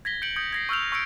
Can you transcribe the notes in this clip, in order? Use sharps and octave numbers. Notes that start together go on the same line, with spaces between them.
G#6 A#6 B6 G7
G6 C#7 D7 F#7
D#6 G6 G#6 C#7
G#6 A#6 C7
C#6 E6 F6 G6 F7
C#6 E6 A#6 C#7 D7